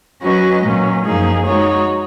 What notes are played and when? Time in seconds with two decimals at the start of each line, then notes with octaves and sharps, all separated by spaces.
0.22 F#3 C#4 F#4 B4 D#5
0.63 A#2 F#3 C#4
1.05 F#2 F3 A#3 D#4 G#4
1.46 G#3 D#4 F#4 C#5